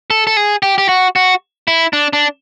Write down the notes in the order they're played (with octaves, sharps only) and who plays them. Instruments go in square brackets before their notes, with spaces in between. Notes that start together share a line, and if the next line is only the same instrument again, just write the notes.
[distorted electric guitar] A4
A4
G#4
G4
G4
F#4
F#4
E4
D4
D4